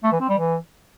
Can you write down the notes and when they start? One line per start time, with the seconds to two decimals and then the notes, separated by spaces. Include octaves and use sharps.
0.03 A3
0.12 E3
0.20 C4
0.29 G3
0.37 E3